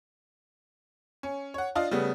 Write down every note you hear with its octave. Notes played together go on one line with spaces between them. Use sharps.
C#4
C#5 F#5
D4 F4 D#5 F5
C#3 G3 A3 B3